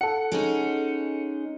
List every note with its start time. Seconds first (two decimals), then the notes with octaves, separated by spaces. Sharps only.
0.01 A4 F#5 C#7
0.32 G#3 C#4 D#4